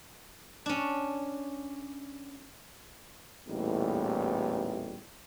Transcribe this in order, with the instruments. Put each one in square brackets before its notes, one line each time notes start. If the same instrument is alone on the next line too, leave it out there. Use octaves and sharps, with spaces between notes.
[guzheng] C#4 D4
[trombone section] A1 E2 A#2 G3 A3 D#4